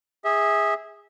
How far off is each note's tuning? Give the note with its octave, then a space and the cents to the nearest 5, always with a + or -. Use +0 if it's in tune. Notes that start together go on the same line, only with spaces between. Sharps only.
G#4 -15 E5 -25